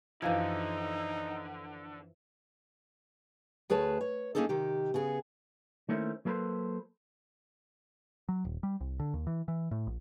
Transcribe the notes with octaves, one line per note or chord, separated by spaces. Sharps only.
F#2 D3 E3 F3 D#4 F5 G#6
D2 G#4 B4 C#5 A5
C#5
A#3 B3 C#4 D#4 G#4 A4
C3 D#3 G4
C#3 B3 G#4
D#3 A3 A#3 C#4 E4 C5
F#3 A#3 A4 B4 C5
F#3
D#1
G3
C2
D3
D#2
E3
E3
A2
A#1